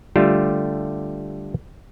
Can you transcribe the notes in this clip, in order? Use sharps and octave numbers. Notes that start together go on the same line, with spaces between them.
D3 G3 A3 F4 G4 A4